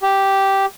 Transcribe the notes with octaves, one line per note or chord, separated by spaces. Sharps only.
G4